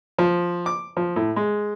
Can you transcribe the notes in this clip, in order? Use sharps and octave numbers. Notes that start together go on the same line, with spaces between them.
F3
D6
F3
A2
G#3